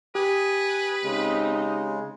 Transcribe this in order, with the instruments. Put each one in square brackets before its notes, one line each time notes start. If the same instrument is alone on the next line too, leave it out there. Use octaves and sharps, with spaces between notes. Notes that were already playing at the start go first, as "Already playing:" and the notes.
[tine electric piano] G4 [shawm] B4 [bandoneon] G#5 D#6 F#6
[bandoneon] C#3 G#3 [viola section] C4 D#4